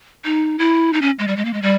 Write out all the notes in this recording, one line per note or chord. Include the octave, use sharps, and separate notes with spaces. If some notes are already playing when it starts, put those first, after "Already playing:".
D#4
E4
D#4
C#4
G#3
G3
G#3
A#3
G#3
G3